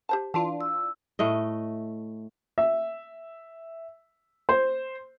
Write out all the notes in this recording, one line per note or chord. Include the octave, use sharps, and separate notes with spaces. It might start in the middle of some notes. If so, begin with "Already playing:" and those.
G4 C5 A5
E3 D4 F4 A5
E6
A2 A3 D#5
E5
C5